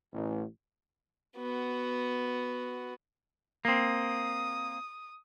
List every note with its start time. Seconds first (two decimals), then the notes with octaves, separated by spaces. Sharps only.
0.13 A1
1.37 B3 F#4
3.65 A#3 C4 D#6